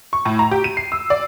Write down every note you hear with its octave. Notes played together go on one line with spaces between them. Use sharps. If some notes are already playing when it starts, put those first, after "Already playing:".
C#6
A2
A#5
G4
D#7
C7
E6
D5